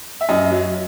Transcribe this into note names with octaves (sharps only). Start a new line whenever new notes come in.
E5
F#2 D#5
F#3